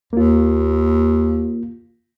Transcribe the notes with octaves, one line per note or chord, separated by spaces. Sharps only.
D#2 A#3 F4